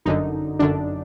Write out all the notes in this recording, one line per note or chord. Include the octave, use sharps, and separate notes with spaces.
G1 F#2 D3 D#4
G1 F#2 D3 D4